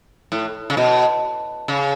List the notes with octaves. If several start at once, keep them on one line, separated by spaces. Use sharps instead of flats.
A2
C#3
B2
C#3